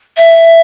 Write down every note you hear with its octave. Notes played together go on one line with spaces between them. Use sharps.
E5